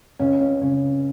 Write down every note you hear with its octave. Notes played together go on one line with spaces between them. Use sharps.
C#2 C#3 C#4
C#4
C#2 C#3 C#4